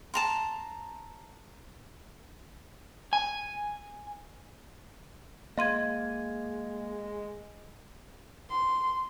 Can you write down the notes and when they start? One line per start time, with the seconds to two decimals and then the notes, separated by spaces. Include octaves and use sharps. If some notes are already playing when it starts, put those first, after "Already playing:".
0.14 A5 A#5 C6
3.13 G#5
5.58 G#3 A#3 D#5 F5 C6 G#6 D#7
8.50 C6